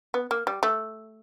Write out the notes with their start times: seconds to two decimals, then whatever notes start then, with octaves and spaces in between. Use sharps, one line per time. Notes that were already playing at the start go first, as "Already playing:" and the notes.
0.14 B3
0.31 A#3
0.47 G3
0.63 A3